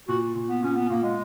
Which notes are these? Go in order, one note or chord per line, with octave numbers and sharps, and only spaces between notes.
A#2 F#4
A#2
B3
A#2 C#4
B3
A#2 A#3
G#3